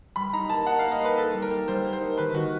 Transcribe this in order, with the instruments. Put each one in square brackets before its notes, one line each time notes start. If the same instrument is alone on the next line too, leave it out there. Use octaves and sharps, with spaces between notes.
[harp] G3 [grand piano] B5
[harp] D#4 [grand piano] A#5
[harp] A#3 [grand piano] A5
[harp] D#4 [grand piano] F#5
[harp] A#3 [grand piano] F5
[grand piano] D#5
[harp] G4 [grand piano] B4
[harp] D#4 [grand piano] A4
[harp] G3
[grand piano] A#4
[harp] G4
[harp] G3 [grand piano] C5
[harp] A#3
[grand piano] C5
[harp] D#4
[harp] D#3 [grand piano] B4
[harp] D#3 [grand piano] F#4